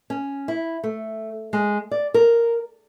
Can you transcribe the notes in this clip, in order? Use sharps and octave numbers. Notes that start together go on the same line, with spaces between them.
C#4
E4
A3
G#3
D5
A#4